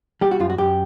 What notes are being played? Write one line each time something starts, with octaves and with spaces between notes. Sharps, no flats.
G3 G4
F#4
F#2 F4
F#4
F#2 G4